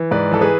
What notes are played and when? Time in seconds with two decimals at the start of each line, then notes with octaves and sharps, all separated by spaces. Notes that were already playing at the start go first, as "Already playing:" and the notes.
Already playing: E3
0.11 G#2 B4 D5
0.31 E3 A4
0.41 G#4 B4